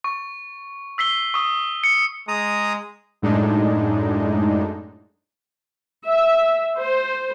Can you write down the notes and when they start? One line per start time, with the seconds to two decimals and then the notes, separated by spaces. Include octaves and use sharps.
0.04 C#6
0.98 E6 B6 C7 G7
1.34 C#6 D#6
1.84 C#7
2.28 G#3 A#5 D#6
3.22 F#2 A2 G#3 D4 D#4
6.06 E5
6.77 C5